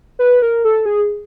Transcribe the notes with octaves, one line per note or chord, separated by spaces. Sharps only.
B4
A#4
A4
G#4